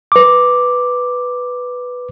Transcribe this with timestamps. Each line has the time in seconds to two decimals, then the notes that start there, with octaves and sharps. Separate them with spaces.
0.12 B4 D6